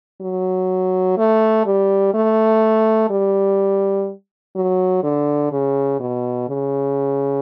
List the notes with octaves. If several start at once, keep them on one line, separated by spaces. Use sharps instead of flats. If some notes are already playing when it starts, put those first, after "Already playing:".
F#3
A3
G3
A3
G3
F#3
D3
C#3
B2
C#3